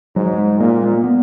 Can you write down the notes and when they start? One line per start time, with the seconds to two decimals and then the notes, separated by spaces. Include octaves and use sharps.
0.15 G#2 F#3
0.38 G#3
0.60 A#2 A#3
0.83 G#3
0.93 A#3
1.04 B3